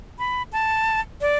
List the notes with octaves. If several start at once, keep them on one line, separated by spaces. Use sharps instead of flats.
B5
A5
D5